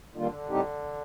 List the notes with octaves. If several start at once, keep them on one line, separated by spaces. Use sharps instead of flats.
D3 D#3 G3 A#3 F4
A2 G3 C4 D#4 G4